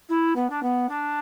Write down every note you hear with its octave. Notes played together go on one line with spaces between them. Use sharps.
E4
B3
D4
B3
D4